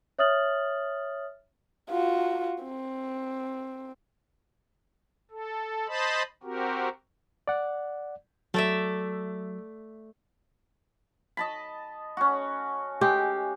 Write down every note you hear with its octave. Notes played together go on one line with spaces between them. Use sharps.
C#5 E5 D#6 F6 A6 F#7
F4 F#4
C4
A4
C5 D#5 A5 B5
C4 F#4 G4 A#4
D5 F#5
F#3 A3 D5 E5
D#5 A5 B5
C#4 F#4
G#3 G4